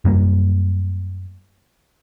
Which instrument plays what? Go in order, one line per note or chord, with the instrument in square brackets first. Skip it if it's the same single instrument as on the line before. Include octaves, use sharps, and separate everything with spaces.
[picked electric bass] F#2 G3 A#3